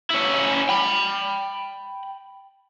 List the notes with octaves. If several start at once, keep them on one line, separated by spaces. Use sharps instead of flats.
C#4 E4
G5 B5